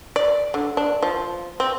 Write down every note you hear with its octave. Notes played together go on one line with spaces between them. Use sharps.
D5
D3
D4
F3
C4